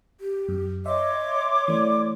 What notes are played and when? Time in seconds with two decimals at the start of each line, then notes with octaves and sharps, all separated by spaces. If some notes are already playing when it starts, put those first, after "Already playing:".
0.21 G4
0.49 F#2
0.86 C#5 D#5 E5 C6 D6
1.68 E3 A3 D5